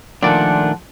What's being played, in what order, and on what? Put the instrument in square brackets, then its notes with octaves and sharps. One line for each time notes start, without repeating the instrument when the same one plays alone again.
[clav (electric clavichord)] A#2 D5 [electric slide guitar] D#3 A3 D4 [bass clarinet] F3 [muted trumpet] F#5